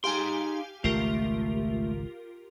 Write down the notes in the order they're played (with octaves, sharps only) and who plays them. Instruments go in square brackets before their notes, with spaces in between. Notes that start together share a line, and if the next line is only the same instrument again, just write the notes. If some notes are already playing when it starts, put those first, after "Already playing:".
[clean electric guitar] D#4 C6 [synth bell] G4 F5 G#5
[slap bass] G#1 C#2 [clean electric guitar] A3 [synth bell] F4 G4 A#4